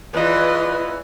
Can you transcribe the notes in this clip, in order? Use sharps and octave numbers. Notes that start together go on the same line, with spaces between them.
E2 E3 F4 B4 D#5